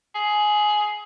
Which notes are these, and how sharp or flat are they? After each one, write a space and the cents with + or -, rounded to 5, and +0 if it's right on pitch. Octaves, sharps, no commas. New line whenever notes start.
G#4 +15